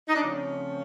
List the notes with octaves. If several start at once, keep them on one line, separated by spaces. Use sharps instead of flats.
D#4
D4
C#3 F3 A3 C4 C#4